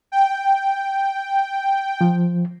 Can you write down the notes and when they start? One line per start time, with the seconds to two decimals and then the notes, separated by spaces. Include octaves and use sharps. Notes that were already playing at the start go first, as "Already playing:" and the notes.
0.12 G5
2.01 F3